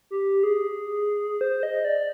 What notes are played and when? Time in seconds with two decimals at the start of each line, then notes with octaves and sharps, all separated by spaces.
0.11 G4
0.43 G#4
1.41 C5
1.63 D#5
1.85 D5